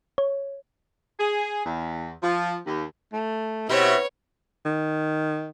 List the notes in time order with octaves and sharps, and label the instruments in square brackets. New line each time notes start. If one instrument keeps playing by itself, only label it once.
[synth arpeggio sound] C#5
[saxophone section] G#4
E2
F3
D#2
[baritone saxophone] A3
[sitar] B2 [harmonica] C4 E4 E5 [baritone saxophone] G4 [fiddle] C#5
[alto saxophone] D#3